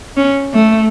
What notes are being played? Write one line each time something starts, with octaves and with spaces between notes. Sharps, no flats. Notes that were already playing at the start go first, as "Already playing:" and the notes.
C#4
A3